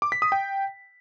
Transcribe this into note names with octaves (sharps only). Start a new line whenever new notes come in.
D6
B6
D#6
G5